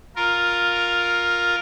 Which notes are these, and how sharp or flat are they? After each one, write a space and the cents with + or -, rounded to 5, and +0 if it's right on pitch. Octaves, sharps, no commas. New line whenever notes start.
F4 +10 A#4 +0